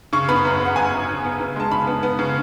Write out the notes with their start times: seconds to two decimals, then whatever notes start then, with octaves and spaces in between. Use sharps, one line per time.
0.13 C#3 C#6
0.29 B3 B5
0.45 F#2
0.60 B3
0.65 F#5
0.76 F#2 G#5
0.92 F#2
1.08 B3
1.24 B3
1.40 C#3
1.56 G#3 A5
1.71 C#3 B5
1.87 B3
2.03 B3
2.19 C#3